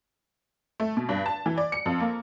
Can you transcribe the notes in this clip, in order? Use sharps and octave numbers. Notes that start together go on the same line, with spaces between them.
A3
B2
G2
A5
E3
D5
C#7
F2
A#3